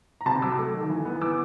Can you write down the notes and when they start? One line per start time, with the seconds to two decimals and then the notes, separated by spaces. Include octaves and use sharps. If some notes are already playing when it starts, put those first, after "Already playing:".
0.21 A#5
0.26 C3 A5 B5
0.42 F#3 D6 E6
0.58 A3
0.74 D#3
0.90 E3
1.05 B3
1.21 E3 D6 E6